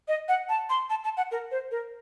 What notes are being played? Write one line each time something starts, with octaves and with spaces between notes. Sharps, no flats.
D#5
F#5
A5
C6
A5
A5
F#5
A#4
C5
A#4